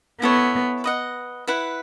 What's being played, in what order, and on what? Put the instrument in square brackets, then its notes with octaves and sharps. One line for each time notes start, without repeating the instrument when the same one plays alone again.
[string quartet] B3 [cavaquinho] E4 A4 C#5
[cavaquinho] B4 D#5 F#5
E4 B4 F#5